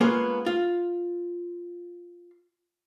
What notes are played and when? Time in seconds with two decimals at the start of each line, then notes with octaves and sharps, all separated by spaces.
0.01 G#3 A#3 B3 C#4 F4 G#4
0.46 F4